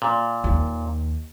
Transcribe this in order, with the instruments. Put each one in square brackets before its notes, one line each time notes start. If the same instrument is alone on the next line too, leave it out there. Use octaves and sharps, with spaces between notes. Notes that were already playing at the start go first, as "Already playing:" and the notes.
[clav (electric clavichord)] A#2
[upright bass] D#2